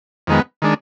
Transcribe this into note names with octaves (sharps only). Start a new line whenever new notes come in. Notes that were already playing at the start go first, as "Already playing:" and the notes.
F2 D#3 G#3 B3
D#3 G#3 D4